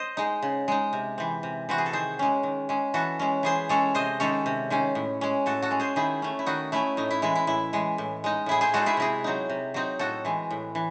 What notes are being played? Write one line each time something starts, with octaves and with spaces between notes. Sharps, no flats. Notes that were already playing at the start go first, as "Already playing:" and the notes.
Already playing: C5 D#5
G#3 D#4
C#3
G#3 D#4
C3
E3 C4
C3
E3 C4 F#4
G#4
A4
D#3 G#4 C5
G#3 C#4
D#3
G#3 C#4
E3 F#4 A4
G#3 C#4
E3 G#4 C5
G#3 C#4 A4 C#5
C3 C5 D#5
D#3 G#3 C#4 A4 C#5
C3
D#3 G#3 C#4
A2
G#3 C#4
A2 F#4 A4
F#4 A4
G#3 C#4
G#4 C5
D#3 E4 G#4
A3 C#4
E4
D#3 D#4 F#4
A3 C#4 E4
A2 D#4
E4
E3 G#3 E4
E4
A2 E4
E3 G#3
A2
G#3 D#4
A2 E4 G#4
G#4 C5
G#3 D#4 F#4 A4
E4 G#4
C3 E4 G#4
F#3 C4 D#4
C3
F#3 C4 D#4
A2 F#4 A4
E3 G#3
A2
E3